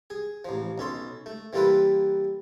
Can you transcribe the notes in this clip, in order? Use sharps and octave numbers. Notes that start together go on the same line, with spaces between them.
G#4
A1 F3
B1 C#4 A4 C6
A3
E3 G3 A#3 F4 A4 B4